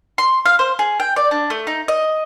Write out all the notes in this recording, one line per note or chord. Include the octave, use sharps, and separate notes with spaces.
C6
F5
C5
G#4
G5
D5
D4
A3
D#4
D#5